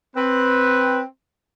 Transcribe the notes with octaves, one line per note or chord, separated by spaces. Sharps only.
C4 B4